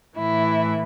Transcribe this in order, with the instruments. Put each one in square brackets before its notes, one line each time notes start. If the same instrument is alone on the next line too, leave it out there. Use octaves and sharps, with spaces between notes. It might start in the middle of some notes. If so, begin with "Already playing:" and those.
[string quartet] A2 E3 E4